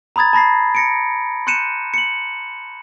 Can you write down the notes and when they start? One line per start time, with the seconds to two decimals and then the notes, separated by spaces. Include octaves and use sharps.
0.16 A#5 B5 D#6 G#6 A6
0.33 A5 B5 A#6 C7
0.75 A#6 C#7 D7
1.47 C6 F#6 G6 C#7 D#7 E7
1.94 C#7 F#7